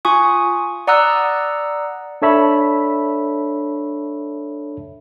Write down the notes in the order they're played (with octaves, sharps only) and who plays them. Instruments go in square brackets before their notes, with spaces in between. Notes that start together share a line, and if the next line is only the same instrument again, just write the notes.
[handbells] F4 G#5 C#6 D#6
D5 F#5 A#5 D#6 E6 F#6
[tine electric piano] D4 A4 C#5 E5 A5 B5